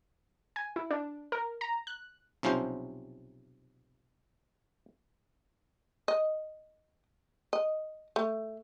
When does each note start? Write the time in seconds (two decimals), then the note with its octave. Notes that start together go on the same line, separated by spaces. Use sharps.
0.56 G#5
0.76 E4
0.91 D4
1.32 A#4
1.61 A#5
1.87 F#6
2.43 B1 C3 F3 C#4 C5
6.08 D#5
7.53 D#5
8.16 A3